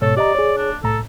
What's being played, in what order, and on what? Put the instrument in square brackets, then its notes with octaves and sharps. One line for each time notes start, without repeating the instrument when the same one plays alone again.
[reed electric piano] G#2 B2 C#5 [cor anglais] A4
[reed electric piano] G4 D#5 A#5 [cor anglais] D5
[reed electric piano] G#4 C#5
[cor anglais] D4
[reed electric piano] C2 A2 A#5 [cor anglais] A4